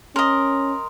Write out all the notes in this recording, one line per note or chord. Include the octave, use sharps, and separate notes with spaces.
C#4 A#4 D#5 C6